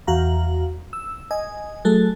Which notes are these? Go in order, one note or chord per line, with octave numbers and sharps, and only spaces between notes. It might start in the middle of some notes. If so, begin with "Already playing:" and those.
E2 F#4 F5 A#5
E6
D#5 G#5
F#3 A3 G#4 A4